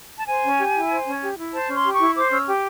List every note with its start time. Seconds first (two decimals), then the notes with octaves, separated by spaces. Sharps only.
0.18 A5
0.27 C5 G#5
0.43 C#4
0.59 G4
0.75 E4
0.91 C5
1.06 C#4
1.22 G4
1.38 E4
1.53 C5 A5
1.69 C#4
1.74 C6
1.85 G4
1.95 C#6
2.00 E4
2.16 C5 D6
2.31 C#4 E6
2.47 G4